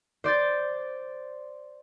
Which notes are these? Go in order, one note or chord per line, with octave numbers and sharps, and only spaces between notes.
C5 D5 G6 A6